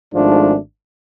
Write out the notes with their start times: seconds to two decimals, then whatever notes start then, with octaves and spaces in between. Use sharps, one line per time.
0.14 G#1 G#2 F3 A3 D4